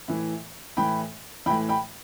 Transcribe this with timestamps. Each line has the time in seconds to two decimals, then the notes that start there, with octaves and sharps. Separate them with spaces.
0.08 A2 E3
0.77 A2 E3 G5 B5
1.46 E3 G5 B5
1.50 A2
1.69 G5 B5